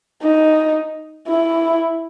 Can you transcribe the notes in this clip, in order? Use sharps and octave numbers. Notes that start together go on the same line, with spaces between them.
D#4
E4